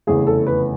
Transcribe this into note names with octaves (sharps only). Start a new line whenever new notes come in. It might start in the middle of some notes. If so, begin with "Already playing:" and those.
F1 E2 C#3 G#4
A4
B4